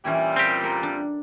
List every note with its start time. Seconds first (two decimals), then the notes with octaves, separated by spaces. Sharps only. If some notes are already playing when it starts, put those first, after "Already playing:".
0.05 A#2 E3 G3 C#4 E4
0.36 C4 G4
0.63 A4 A#4 G5
0.83 D4